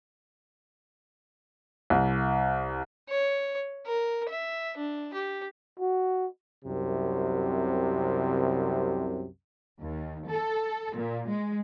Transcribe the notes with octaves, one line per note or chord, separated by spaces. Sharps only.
C2
C#5
A#4
E5
D4
G4
F#4
C2 F#2 C3
D#2
A4
A#2
G#3